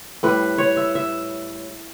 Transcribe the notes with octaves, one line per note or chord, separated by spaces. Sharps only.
A2 G3 B4
C#5
E5
E5